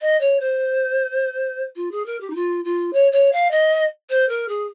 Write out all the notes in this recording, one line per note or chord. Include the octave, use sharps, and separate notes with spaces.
D#5
C#5
C5
F4
G#4
A#4
G4
D#4
F4
F4
C#5
C#5
F5
D#5
C5
A#4
G#4